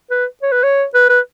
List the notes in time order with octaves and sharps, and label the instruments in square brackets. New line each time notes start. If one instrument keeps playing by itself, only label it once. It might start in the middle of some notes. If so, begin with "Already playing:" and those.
[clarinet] B4
C#5
B4
C#5
B4
B4